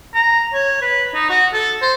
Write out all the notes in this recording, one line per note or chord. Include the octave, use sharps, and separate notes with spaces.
A#5
C#5
B4
D#4
F#4
A4
C5